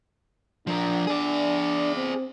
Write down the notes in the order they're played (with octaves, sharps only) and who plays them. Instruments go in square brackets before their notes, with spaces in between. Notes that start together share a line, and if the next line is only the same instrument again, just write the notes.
[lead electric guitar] F3 A#4 [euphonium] D4
[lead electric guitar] G#4 D5
[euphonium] C4